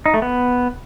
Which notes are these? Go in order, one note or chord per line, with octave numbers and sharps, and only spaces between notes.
D#4
A3
B3